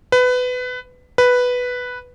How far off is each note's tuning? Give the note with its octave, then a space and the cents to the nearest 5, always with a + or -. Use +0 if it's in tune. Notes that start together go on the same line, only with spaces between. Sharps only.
B4 +20
B4 +0